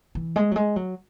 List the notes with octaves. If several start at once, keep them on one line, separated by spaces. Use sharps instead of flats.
E3
G#3
F#3
G#3
F#3